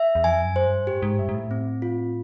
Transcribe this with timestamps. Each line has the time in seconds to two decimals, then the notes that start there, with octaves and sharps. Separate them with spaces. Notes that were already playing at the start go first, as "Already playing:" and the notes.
Already playing: E5
0.15 E2
0.24 F2 G#5
0.45 F#2
0.56 C5
0.66 G2
0.87 G#2 G4
1.02 G#2
1.19 G2 E5
1.29 G#2
1.34 A2
1.51 C4
1.82 F4